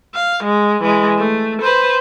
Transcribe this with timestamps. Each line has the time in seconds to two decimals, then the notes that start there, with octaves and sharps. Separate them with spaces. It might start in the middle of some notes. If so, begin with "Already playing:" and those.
0.14 F5
0.43 G#3
0.81 E3 G#3
1.18 A3
1.61 B4 C5